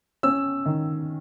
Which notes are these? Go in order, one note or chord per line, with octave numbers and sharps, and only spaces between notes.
C#4 E6
D#3